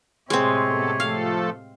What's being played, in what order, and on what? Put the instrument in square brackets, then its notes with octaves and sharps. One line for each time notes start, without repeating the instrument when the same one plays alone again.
[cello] A2 C3 [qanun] G#3 C4 [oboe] C#5
[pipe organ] B3 A4
[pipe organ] F3 A3 A4 [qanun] F5